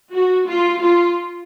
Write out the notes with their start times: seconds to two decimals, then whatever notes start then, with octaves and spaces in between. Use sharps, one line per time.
0.11 F#4
0.46 F4
0.81 F4